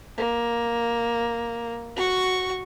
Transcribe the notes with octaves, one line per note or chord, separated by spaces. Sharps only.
A#3
F#4 C#6